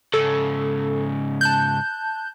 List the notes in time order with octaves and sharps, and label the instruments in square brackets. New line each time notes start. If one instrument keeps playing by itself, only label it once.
[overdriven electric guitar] G#2 C#3 [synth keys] A4
[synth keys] A5 F#6 G6